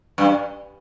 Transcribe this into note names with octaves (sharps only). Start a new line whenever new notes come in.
G2